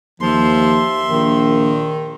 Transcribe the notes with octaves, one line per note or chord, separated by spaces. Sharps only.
D#2 F3 E5 C6
A#1 D#3